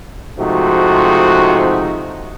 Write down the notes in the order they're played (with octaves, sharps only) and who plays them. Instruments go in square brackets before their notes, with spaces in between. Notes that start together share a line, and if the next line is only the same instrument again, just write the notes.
[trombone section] G#2 C3 F3 A3 D#4 F#4